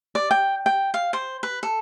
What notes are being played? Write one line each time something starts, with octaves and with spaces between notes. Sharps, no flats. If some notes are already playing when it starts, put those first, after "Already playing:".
D5
G5
G5
F5
C5
B4
A4